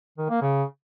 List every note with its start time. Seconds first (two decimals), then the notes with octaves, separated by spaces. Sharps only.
0.18 D#3
0.30 A#3
0.42 C#3